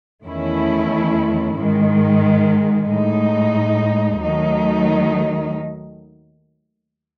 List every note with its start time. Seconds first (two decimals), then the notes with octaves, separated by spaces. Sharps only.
0.24 E2 D#3 A3 C#4 E4
1.57 G#2 D#3 G#3
2.89 A2 G#3 D#4
4.22 D#2 D#3 F#3 A3 D#4